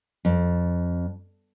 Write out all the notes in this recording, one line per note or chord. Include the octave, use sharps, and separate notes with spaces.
F2